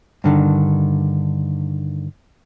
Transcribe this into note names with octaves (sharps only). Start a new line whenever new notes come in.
G2 D3 D#3